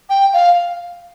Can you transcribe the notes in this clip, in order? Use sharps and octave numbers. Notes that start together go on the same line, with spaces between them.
G5
F5